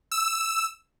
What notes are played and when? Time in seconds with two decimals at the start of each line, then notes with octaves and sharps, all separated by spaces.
0.12 E6